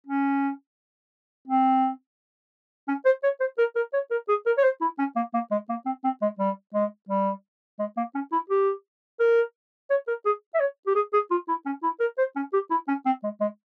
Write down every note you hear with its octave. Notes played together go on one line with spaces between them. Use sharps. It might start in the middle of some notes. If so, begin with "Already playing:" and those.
C#4
C4
C#4
C5
C#5
C5
A#4
A#4
C#5
A#4
G#4
A#4
C#5
C5
E4
C#4
A#3
A#3
G#3
A#3
C4
C4
G#3
G3
G#3
G3
G#3
A#3
C#4
E4
G4
A#4
C#5
A#4
G#4
E5
C#5
G4
G#4
G#4
F4
E4
C#4
E4
A#4
C5
C#4
G4
E4
C#4
C4
G#3
G#3